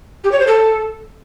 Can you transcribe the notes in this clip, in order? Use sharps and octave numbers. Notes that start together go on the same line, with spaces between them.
G4
C#5
C5
A4